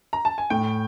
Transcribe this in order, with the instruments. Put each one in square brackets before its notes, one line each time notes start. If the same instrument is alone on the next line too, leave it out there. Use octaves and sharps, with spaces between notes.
[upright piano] A#5
A5
G#5
[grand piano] A2 [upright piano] G5